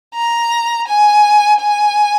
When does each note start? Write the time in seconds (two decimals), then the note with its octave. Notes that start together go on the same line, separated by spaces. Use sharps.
0.15 A#5
0.88 G#5
1.61 G#5